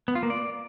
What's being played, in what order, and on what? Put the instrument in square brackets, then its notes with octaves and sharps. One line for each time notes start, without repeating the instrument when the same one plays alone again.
[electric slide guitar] B3
F4
A#3
D5